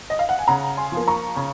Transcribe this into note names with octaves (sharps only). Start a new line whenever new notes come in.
D#5
F5
F#5
G#5
C#3 F#5 A#5
G#5 C6
F3
A#3
A#5 C#6
C#3